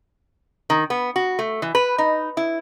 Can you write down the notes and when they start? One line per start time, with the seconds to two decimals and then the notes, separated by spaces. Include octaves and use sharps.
0.70 D#3
0.90 B3
1.16 F#4
1.39 A3
1.62 E3
1.75 B4
1.98 D#4
2.37 E4